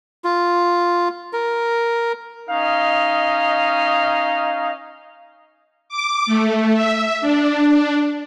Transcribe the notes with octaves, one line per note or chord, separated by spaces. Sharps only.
F4
A#4
C#4 D#4 D#5 F5
D6
A3
E5
D4